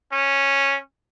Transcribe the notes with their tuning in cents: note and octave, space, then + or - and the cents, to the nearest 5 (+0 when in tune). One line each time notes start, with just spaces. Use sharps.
C#4 -5